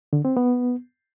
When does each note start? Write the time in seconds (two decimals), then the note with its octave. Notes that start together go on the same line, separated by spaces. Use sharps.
0.13 D3
0.25 C4
0.37 B3